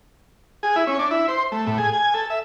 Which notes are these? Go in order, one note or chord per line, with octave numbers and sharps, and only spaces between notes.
G#4
E4
C#4
D4
E4
C5
A3
A2
G#4
G#5
A4
E5